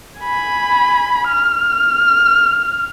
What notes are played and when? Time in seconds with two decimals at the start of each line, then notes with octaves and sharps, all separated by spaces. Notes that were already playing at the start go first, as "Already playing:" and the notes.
0.20 G#5 B5
1.27 F6